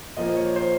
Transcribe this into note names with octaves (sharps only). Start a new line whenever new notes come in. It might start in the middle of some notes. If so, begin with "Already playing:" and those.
A#2 F3 A#3 D#5
C#5
C5